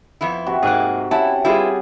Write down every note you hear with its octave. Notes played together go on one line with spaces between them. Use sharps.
F2 B3 E4
C3 F#4 E5
G#2 A#3 G#4 F#6
C3 C#4 E4 F#5 A5
G3 E4 F4 G#4 B4